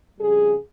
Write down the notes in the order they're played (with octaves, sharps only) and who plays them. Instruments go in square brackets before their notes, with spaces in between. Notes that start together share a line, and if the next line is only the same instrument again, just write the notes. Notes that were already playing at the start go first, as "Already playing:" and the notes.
[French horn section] F2 C#3 G3 G#4